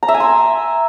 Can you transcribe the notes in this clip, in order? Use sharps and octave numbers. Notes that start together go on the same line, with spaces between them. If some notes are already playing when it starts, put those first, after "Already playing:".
A#5
E5
G#5
C6